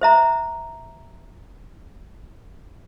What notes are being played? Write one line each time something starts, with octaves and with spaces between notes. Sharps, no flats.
C5 E5 A#5